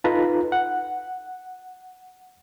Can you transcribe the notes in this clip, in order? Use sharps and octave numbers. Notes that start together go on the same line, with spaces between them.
D#4 F4 A4 B4 A#5
F#5